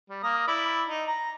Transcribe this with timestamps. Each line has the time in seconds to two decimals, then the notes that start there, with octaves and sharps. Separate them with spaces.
0.10 G3
0.23 A#3 A#5 D#6
0.48 E4 D5 B5
0.89 D#4
1.07 A#5